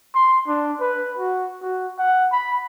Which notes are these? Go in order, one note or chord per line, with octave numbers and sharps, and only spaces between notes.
C6
D4
B4
F#4
F#4
F#5
B5